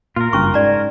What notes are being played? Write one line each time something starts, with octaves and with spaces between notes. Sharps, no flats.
A#2 F4 A#4
F#1 G2 C#4 C#6
G#2 D5 A#5